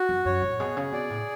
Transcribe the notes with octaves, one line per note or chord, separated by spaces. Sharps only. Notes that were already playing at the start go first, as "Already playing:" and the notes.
Already playing: F#4
F#2
F#2 C#5
A2
B2 G#4
C#3
B2 D5
A2